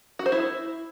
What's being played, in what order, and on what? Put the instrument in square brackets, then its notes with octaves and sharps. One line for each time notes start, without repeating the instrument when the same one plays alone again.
[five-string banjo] F#4
C5
E4